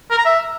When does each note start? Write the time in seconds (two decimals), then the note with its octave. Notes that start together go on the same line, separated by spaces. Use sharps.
0.11 A#4
0.18 A#5
0.25 E5